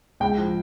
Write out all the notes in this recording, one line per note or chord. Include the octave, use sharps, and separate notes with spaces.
C#2 G5
F3